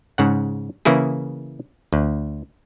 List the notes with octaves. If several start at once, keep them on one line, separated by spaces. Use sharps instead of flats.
G#2 C#3 F#5
C#3 E3 A#3 E4 G#4
D2